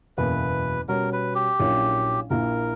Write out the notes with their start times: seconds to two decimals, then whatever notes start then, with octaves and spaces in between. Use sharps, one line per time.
0.17 F#1 E2 B2 F#3 A#3 B4
0.88 B2 G3 C#4 F#4 A#4
1.13 B4
1.35 G4
1.59 A#1 A#2 F#3 C#4 E4
2.30 A#1 A#2 A#3 E4 A#4